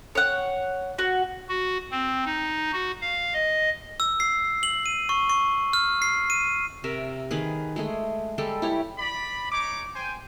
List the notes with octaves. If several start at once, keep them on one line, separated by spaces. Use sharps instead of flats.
C#5 F#5
F#4
F#4
C4
D#4
F#4
F5
D#5
E6
C7
F#7
D#7
C#6
C#6
F6
C7
D#7
C3 A#4 E5
D#3 G#4 B4
G#3 A3 G#4
G3 G#3 G4 A4
E4 G4 C#5
D5 B5
D#4 C#5 D6
C5 G5 G#5